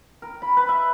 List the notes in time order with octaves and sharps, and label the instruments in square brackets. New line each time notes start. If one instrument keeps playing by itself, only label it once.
[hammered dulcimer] A#4
B5
B4
E5